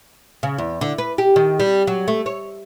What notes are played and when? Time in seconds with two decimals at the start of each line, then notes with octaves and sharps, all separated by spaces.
0.43 C#3
0.58 E2
0.81 D3
0.98 B4
1.18 G4
1.36 D#3
1.60 G3
1.87 F#3
2.08 A3
2.26 C#5